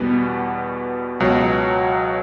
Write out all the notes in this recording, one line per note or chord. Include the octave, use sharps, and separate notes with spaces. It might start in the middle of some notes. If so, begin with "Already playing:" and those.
Already playing: E2 B2 G3 B3
C#2 B2 F#3